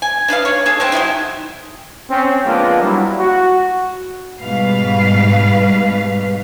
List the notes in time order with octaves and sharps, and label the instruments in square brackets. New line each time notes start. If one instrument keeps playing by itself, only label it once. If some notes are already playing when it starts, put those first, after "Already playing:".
[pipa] G#5
D4 D#4 B4 F5
C#5
D4 G#4 A4
G#3 A3 C4
F#3 G#3 D#4 E4
[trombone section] C4 C#4
F3 G#3 A#3 B3 D4 F4
F#3 G3 E4
F#4
[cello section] G#2 B2 G3 B4 F5